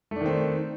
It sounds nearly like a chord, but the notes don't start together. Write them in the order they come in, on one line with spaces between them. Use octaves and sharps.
A3 D4 D#3 C4